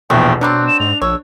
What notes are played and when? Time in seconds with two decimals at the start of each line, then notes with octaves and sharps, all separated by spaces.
0.10 A#1 E2 B2 A3 B3 G5
0.41 F#3 G3 C4 D4 F#6
0.67 E7
0.80 G#2 F7
1.02 A#1 C#5 E6